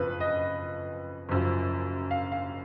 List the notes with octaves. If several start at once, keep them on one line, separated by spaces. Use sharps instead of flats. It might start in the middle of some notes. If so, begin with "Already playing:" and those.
Already playing: F#1 F2 C#3 F3 B4
D#5
F#1 F#2 F3
F5
F5